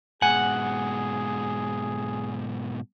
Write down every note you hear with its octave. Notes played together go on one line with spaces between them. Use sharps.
G#2 B2 G#4 F#5 G#5